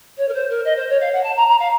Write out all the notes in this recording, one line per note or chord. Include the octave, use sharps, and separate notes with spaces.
C#5
A#4
C5
A#4
D#5
C5
C#5
F5
F#5
A5
A#5
A#5
F5